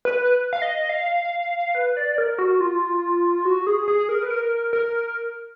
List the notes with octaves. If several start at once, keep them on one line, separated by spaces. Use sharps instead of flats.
B4
F5
D#5
F5
B4
D5
A#4
F#4
F4
F#4
G#4
G#4
A#4
B4
A#4
A#4